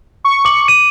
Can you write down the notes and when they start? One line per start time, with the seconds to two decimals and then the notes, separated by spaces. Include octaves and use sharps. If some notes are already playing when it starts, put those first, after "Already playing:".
0.25 C#6
0.45 D6 F#7
0.68 D#7